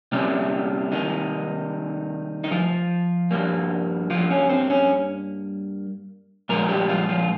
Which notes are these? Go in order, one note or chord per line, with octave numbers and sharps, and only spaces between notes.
C3 G3 A#3 C#4
D#3 D#4
D#4
F3 F4
G2 G3 A#3
F3 F4
C#4
C4
C#4
A#2 F3 G#3 A#3 A#4
G3 G4
F3 F4
F3 F4